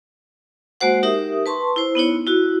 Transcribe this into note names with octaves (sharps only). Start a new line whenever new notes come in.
G#3 A#3 F#4 C5 F#5
D#4 G4 A#4 E5 D#6
B4 A5 C6 C#6
E4 C5
B3 D#4 E4 C#5
E4 F#4